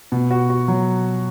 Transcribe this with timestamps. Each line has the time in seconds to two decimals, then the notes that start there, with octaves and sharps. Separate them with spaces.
0.12 B2
0.31 F#4
0.50 F#4
0.68 F#3